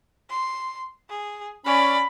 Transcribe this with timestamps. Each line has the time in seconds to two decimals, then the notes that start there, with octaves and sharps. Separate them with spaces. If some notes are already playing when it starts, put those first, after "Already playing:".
0.30 C6
1.10 G#4
1.66 C#4 D5 B5